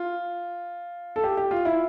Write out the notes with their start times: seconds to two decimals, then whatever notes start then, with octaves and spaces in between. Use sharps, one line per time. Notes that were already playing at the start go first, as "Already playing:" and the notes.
Already playing: F4
1.16 A4
1.24 G4
1.37 G4
1.51 F4
1.65 E4